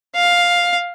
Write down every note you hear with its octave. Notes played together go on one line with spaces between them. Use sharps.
F5